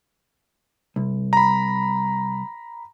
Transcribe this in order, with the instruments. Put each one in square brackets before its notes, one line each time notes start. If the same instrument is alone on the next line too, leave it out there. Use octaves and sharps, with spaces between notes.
[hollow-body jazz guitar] C2
[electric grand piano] A#5 B5